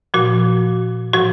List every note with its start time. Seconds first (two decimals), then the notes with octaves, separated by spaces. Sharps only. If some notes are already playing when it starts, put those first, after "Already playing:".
0.14 A#2 F3 F#4
1.13 A2 F3 F#4